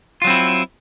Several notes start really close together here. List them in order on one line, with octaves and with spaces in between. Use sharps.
F4 F#3 C4 E4